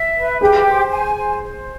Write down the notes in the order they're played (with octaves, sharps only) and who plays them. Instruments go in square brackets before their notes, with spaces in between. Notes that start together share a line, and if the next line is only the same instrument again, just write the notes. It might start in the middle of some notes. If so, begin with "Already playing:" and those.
Already playing: [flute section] E5
B4
[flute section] G4 [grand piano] G#4
[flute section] C5
G#5
C5
C5